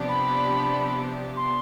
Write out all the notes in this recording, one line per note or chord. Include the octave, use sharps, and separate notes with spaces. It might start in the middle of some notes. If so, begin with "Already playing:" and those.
Already playing: C3 F3 B3 D4 G4
B5
C6